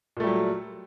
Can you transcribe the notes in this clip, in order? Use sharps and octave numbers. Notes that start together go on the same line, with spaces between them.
A#2 F#3 G3 A3